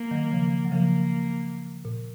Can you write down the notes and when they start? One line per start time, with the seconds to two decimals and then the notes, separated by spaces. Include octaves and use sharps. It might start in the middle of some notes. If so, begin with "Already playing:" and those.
Already playing: A#3
0.11 D#3 F#3
0.31 C#3 F3
0.65 F#3
0.72 C#3 F3 A#3
1.85 A#2